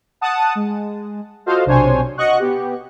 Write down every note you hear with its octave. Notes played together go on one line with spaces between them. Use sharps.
F#5 A5 D#6
G#3
F4 F#4 A4 C5 D#5 F5
B1 C3 D4 C5 C#5 G#5
F#4 D#5 F#5 C#6 F#6
B3 G4